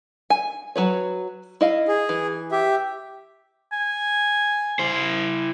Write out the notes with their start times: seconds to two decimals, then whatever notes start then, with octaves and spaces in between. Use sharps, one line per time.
0.30 G#5
0.76 F#3 B4 C#5
1.61 E4 D#5 F5
1.88 G#4
2.09 E3
2.51 G4 E5
3.72 G#5
4.79 E4 C5